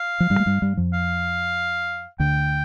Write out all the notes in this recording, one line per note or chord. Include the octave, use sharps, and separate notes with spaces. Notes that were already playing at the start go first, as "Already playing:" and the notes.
Already playing: F5
F3
G2 G3
A3
G2 G3
G2 G3
F2 F3
F5
D2 D3 G5